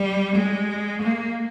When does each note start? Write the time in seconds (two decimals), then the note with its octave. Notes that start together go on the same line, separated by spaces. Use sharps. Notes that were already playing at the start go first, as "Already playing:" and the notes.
Already playing: G3
0.35 G#3
1.01 A#3